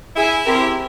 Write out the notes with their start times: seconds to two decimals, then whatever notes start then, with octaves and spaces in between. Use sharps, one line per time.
0.16 E4 G#4 E5 G#5
0.45 C4 G4 A#4